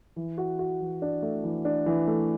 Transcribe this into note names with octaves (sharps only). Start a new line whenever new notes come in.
E3
F#4
F#4
E3
D4
A3
E3
D4
E3
A3